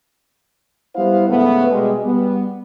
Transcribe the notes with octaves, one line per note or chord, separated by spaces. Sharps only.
G3 B3 E4 C5 F5
G#2 C#3 A3 B3
B2 G3 G#3
G3 B3